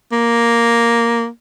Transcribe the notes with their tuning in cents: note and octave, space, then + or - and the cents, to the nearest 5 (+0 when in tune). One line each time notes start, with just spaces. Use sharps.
A#3 +0